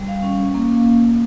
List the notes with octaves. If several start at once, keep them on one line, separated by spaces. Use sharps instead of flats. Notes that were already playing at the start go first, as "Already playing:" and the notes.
Already playing: G3
F5
C#4
A#3